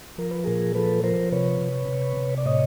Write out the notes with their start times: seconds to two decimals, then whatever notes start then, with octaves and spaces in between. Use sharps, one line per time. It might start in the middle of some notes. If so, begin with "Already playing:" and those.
0.18 F3 A#4
0.31 B4
0.44 A#2 G#4 A#4
0.75 F3 A4 B4
1.04 F3 A#4 C5
1.32 C3 B4 C#5
1.61 C3
1.88 C3
2.17 C3
2.38 D5
2.46 A2 C#5 D#5